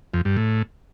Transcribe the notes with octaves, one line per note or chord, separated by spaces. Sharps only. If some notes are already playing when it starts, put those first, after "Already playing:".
F2
G2
A2